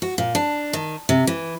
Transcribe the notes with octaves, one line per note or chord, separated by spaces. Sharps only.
F#4
A#2
D4
D#3
C3
E3